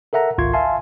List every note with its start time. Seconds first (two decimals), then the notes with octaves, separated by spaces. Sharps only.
0.13 A4 A#4 E5 F#5 A#5
0.38 G#1 C#2 F4 C6 C#6 G#6
0.53 E5 F5 G#5 A5 C6